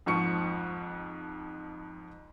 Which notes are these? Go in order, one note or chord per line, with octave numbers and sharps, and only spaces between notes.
F2 G#2 F3 C#6 C#7